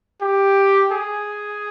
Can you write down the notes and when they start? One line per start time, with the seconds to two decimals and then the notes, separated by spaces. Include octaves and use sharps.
0.21 G4
0.92 G#4